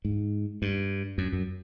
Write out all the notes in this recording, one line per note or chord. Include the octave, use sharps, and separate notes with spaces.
G#2
G2
F#2
F#2